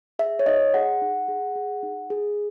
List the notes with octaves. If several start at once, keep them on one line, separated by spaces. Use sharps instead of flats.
G#4 E5
C#5
D#4 D#5
G#4 F#5
D#4
G#4
G#4
D#4
G#4